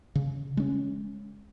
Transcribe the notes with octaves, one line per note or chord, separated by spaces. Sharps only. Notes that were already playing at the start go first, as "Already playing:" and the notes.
C#3
G#3 C#4